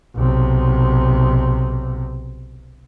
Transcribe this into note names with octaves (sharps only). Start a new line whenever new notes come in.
B1 C3